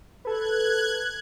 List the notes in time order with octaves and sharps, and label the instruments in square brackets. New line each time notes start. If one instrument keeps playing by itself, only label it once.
[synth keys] A4 B4 [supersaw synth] F#6 G#6